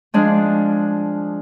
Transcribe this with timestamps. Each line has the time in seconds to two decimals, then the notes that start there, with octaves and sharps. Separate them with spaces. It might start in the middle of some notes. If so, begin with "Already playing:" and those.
0.14 F3 G#3 D4